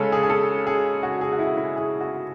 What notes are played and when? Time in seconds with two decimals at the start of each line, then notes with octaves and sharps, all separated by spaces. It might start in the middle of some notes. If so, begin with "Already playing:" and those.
Already playing: C#3 G#3 C#4 A4 C#5
0.12 G#4
0.23 G#4
0.30 A4
0.67 G#4
1.03 F#4
1.21 G#4
1.33 F#4
1.39 E4
1.57 E4
1.76 G#4
2.01 F#4